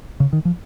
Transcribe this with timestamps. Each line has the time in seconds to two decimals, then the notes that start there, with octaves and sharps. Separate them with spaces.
0.20 C#3
0.33 D#3
0.45 F3